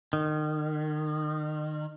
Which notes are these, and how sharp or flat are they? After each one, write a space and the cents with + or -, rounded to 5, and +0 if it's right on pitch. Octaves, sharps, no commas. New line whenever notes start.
D#3 -30